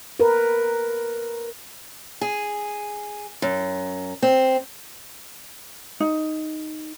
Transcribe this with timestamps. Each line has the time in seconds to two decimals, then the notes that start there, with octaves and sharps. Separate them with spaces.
0.20 A#4 B4
2.21 G#4
3.42 F#2
4.22 C4
6.00 D#4